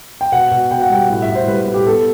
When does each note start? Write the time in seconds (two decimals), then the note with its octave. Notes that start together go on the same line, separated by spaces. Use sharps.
0.21 G5
0.32 B2 F#5
0.51 B2
0.71 B2 G5
0.82 F#5
0.90 G3 G5
1.10 A2 F#5
1.22 E5
1.29 A2
1.35 C5
1.48 G3 B4
1.61 B4
1.68 A2
1.74 G4
1.87 B3 A4